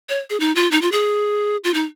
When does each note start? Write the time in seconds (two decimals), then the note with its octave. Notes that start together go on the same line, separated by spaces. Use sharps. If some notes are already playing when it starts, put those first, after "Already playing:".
0.09 C#5
0.30 G#4
0.40 D#4
0.55 F4
0.71 D#4
0.82 F4
0.92 G#4
1.64 F4
1.74 D#4